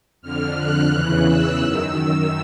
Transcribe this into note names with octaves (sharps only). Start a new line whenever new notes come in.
F2 D3 F6
F#6
E2 C#3 E3 F#6
E6
F#2 D#3